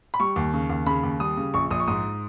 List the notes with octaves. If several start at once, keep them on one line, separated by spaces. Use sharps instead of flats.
B5
G3 C#6
D#2
C#3
D#2
C#3 B5
D#2
G3 D#6
C#3
A#1 C#6
A#1 D#6
C#6
G#2 D#6